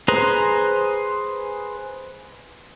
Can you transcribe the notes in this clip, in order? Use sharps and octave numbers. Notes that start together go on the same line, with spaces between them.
G#4 B4 C5 A#5 C6